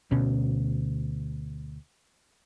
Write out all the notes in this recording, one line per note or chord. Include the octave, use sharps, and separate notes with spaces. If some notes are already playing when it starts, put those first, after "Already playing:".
D2 B2 C#4